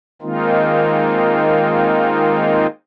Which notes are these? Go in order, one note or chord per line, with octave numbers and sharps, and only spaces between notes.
D#3 G#3 A#3 C4 D#4 F4